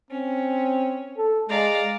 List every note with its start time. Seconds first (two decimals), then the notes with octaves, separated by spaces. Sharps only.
0.11 C4 C#4
1.18 A4
1.49 G#3 D5 F5 A#5